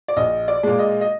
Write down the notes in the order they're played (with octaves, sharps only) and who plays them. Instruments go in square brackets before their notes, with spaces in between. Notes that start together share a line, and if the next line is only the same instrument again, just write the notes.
[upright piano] D5
A#1 D#5
D5
A#2 G#3
D#5
D#5